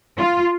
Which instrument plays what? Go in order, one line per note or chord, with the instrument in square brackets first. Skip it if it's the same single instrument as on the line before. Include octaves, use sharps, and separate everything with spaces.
[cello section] F4